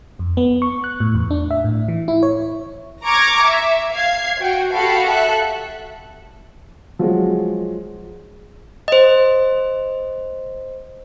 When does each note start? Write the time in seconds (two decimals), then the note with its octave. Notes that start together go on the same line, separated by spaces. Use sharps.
0.19 F2
0.37 B3
0.62 C#6
0.84 F#6
1.00 A2
1.15 E2
1.31 D4
1.51 E5
1.64 A2
1.88 E3
2.08 E4
2.23 C#5
3.04 A#5 C#6 D6 F6 G#6 A#6
3.45 E5
3.93 F5 G#6 C7
4.40 F#4 G5
4.72 F#4 G4 A4 F5 G5 B5
5.09 A4 E5 F#6
6.99 F3 F#3 G#3
8.88 C5 D#5